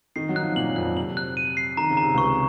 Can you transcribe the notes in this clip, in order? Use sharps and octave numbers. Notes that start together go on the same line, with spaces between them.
D#3 D#4 C7
F#3 F#4
D#4 F#6
F3 F4
A#2 A#3 F#7
F#3
F2 F3 F#6
C3 F#7
F#6
D#7
C7
D#3 A#5
C#3
C3 A#5
C#2 C#3 C#6